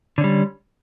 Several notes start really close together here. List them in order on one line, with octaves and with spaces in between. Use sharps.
D3 C#4 G3